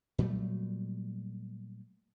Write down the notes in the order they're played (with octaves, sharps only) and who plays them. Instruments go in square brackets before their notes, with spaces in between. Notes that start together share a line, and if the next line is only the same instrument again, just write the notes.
[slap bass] A#2 F#3 G3 A3